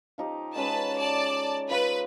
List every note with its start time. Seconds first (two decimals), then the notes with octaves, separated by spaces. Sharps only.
0.18 F3 D#4 G4
0.56 G#3 C#4 B4 D#5 A5
0.98 D5 A5
1.71 F4 B4 D#5